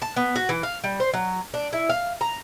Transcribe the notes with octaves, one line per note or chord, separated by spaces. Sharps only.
A5
B3
F#4
E3
F5
G3
C5
F#3
D4
E4
F5
A#5